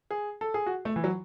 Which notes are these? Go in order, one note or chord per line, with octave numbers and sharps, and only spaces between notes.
G#4
A4
G#4
F#4
A3
E3
F#3